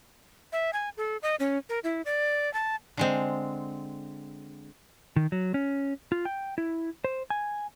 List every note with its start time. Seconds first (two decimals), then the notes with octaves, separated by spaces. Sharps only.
0.53 E5
0.73 G#5
0.97 A4
1.22 D#5
1.40 C#4
1.69 A#4
1.84 E4
2.05 D5
2.54 A5
2.97 D3 G#3 C4
5.16 D#3
5.32 F#3
5.54 C#4
6.12 F4
6.25 G5
6.58 E4
7.04 C5
7.30 G#5